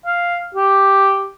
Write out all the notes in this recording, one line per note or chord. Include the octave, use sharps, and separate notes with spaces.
F5
G4